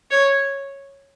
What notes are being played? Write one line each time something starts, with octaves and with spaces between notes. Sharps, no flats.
C#5